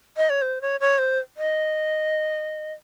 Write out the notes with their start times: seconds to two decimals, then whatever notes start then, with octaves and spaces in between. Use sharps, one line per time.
0.17 D#5
0.30 C#5
0.42 C5
0.61 C#5
0.80 C#5
0.98 C5
1.37 D#5